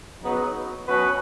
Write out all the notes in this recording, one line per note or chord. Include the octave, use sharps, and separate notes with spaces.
C#3 F#3 B3 D#4
B2 F#3 C#4 F#4 B4